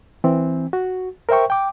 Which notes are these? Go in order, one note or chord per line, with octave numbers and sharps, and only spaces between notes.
E3 C4
F#4
A#4 C5 E5 G5 C#6
G5 D6